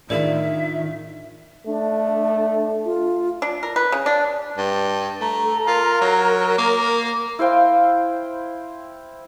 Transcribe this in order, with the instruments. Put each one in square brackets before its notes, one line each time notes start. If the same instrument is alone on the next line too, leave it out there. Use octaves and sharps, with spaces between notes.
[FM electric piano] A2 D4 F4 [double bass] D#3 [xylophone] G#4 A#4 D5 [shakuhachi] E5
[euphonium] A3 [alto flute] D4
[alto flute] F4
[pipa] D4
A#4
B4
C#3
D4
[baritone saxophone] G2
[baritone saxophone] A3 [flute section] A#5
[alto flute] A4
[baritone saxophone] F4 [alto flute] A#4
[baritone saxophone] F#3
A#3
[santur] E4 C5 F5 G5